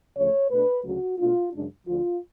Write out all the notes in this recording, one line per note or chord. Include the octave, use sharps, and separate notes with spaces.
D2 C#3 F3 A3 C#5
B2 A3 D4 B4
D2 C#3 F#3 A3 F#4
B2 A3 D4 F4
F#2 C#3 G#3 D4
D2 D3 F3 F4